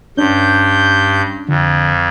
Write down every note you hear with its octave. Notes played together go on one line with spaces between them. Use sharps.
G2 C#4 D4 G6
F2 D3